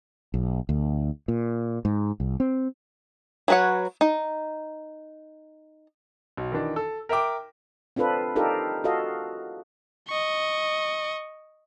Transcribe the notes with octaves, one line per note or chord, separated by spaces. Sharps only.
B1
D2
A#2
G#2
C2
C4
F#3 F#4 B4 C#5 F#5
D#4
B1
D#3 E3 D4
A4
A#4 E5 G5 D6
C4 D4 F4 A4 B4
D4 D#4 F4 G4 A4 A#4
F4 F#4 A4 D#5 F5
D#5 C#6